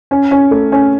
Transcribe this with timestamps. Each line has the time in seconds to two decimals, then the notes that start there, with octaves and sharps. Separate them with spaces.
0.11 C#4
0.31 C#4
0.51 A3
0.72 C#4